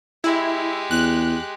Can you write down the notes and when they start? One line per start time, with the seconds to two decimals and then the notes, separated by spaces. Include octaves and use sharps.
0.24 G#3 E4 G4
0.91 E2 F#6